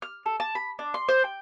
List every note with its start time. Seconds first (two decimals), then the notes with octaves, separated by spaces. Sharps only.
0.02 F6
0.26 A4
0.40 A5
0.55 B5
0.79 D4
0.94 C6
1.09 C5
1.24 G5